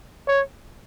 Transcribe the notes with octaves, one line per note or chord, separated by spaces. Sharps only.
C#5